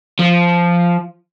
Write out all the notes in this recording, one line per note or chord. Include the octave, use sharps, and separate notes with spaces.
F3